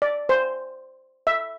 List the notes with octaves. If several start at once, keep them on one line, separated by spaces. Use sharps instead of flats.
D5
C5
E5